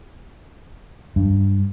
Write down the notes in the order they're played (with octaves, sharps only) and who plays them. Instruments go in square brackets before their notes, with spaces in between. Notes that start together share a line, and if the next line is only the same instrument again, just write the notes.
[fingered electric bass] G2